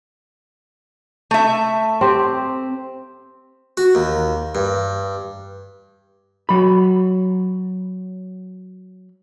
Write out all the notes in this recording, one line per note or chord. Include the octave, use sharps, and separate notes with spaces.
A3 E5
C4 G4
F#4
D#2
G2
F#3 B5